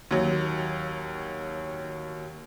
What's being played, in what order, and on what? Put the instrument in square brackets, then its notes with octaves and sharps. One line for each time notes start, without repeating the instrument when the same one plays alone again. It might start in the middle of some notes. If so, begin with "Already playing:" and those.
[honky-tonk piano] D#2 F#3